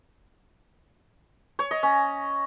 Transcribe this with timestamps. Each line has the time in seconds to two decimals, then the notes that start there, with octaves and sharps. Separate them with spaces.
1.59 C#5
1.71 D#5
1.83 C#4